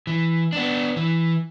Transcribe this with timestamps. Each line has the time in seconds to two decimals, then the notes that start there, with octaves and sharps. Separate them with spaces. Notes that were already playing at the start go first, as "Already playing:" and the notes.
0.07 E3
0.53 B3 D4
0.97 E3